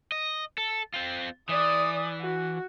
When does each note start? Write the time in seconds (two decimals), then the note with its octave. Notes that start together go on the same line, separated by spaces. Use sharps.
0.12 D#5
0.58 A4
0.94 C4 F4
1.49 E3 D5 D#6
2.21 F#4